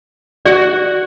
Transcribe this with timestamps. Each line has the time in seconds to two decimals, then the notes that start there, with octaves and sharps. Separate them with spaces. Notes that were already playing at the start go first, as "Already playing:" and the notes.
0.45 F#4 D5